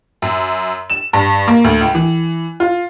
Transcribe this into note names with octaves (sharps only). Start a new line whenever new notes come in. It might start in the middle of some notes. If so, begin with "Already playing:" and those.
F#2
E7
G2
A#3
D2
C#2
E3
F4